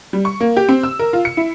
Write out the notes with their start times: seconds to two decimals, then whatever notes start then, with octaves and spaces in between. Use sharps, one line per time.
0.13 G3
0.25 C#6
0.41 A#3
0.57 G4
0.69 C4
0.83 E6
0.99 A#4
1.13 F4
1.25 C#7
1.37 E4